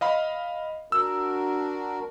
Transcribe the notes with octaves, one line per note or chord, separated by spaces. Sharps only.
D#5 F5 B5
D4 F#4 A#4 E6